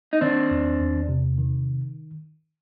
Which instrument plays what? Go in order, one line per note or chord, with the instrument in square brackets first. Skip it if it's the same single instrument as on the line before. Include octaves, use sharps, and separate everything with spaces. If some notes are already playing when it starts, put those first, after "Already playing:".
[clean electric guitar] D#4
[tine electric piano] D#3 [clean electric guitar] C4 D4
[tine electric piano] E2
E2
C3
D#3